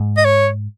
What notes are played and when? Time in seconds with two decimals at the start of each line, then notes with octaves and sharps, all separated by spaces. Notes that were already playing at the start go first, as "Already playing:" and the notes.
Already playing: G#2
0.17 D#5
0.25 C#5